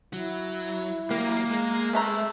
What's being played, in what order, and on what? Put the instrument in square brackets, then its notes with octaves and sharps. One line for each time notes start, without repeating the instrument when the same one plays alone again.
[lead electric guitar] F#3 [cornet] E4
[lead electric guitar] F#3 G4 [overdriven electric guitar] A#3
[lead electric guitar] G#3
[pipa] C3 A3 A#5